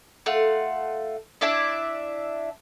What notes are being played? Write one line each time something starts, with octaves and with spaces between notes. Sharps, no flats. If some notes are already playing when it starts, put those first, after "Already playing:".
A3 F4 F#5
D4 E4 D5 E5